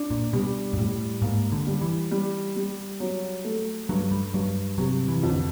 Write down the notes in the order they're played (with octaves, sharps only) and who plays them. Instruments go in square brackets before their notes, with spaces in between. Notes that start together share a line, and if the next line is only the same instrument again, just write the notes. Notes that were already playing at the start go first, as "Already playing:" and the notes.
Already playing: [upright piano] D4
[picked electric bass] A#2
[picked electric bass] B2 [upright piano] G3
[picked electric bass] G#2
[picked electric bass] A2 [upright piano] G3
[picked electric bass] G#2 [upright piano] A#3
[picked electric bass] D3
[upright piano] G3
[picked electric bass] E3
[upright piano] G3
G3
F#3
A3
[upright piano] G2 [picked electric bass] F#3
[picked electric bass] G3
[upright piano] G2 [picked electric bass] F#3
[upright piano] C3 [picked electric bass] F#3
[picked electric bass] E3
[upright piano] F2
[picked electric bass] D3